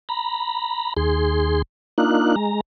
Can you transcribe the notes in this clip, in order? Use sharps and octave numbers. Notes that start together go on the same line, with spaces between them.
A#5 B5
D#2 G#4 C6
A#3 D4 D#4 F4 F#6
G#3 A#5